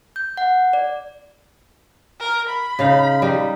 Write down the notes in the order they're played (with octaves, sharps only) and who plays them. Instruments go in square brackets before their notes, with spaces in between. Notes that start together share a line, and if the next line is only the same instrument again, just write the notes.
[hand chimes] G6
F#5
D5
[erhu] A#4
B5
[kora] C#3 D#4 F5
G3 D#4